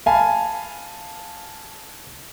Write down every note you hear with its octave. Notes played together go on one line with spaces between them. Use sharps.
F5 G#5 A5 B5